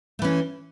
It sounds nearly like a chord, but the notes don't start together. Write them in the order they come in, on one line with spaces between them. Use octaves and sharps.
A3 E3 C#4